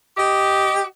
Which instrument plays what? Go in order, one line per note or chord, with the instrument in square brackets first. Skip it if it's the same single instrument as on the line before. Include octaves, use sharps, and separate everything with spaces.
[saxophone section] G4 D#5